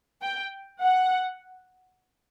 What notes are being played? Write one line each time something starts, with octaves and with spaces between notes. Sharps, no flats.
G5
F#5